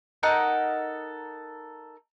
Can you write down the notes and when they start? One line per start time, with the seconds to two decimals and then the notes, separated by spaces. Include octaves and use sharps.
0.23 D#4 A4 A#4 F#5